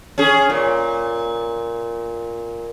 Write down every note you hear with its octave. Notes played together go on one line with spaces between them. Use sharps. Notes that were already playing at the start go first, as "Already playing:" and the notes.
C#4 G#4
A#2